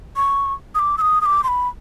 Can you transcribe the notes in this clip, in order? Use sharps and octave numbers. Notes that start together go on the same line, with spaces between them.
C#6
D#6
D6
E6
D#6
D#6
D6
C6
B5